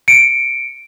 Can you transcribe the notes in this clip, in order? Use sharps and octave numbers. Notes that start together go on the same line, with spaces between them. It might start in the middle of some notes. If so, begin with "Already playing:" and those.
C#7 D7